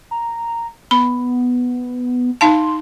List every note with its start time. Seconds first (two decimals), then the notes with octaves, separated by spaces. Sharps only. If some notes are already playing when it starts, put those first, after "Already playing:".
0.11 A#5
0.91 B3 B5
2.41 D#4 F5 A5 C6